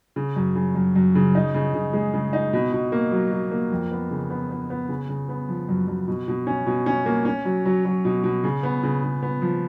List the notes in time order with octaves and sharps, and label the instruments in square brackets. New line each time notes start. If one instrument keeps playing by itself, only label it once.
[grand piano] C#3
F#2
C#3
F#2
F#2
C#3
D#4
C#3
C#3
G#3
C#3
D#4
B2
B2
A#3
F#3
F#3
A#3
F2
B3
C#3
B3
B3
B3
C#3
C#3
B3
F3
F#2
F#2
B2
B2
C#4
B2
C#4
A#3
C#4
F#3
F#3
F#3
B2
B2
C#3
B3
C#3
C#3
B3
F3